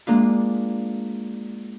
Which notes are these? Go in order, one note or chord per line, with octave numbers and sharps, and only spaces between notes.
G#3 A#3 D4 F4